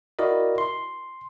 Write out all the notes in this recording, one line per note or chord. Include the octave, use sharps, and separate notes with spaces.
E4 F#4 A#4 D5 D#5
C6